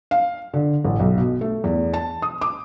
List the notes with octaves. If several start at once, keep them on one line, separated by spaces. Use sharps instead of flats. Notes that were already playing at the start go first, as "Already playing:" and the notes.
F5
D3
A1
B1
B2
A3
E2
A5
D#6
D6